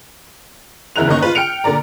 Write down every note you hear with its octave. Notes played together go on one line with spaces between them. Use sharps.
E2 C#3 E4 A#4 F#6 F7
G1 D#3 A#3 C#4 D#5 C#6
F4 B4
G5 F6 C#7 D7 F7
A#2 D3 A#4 D5 A#5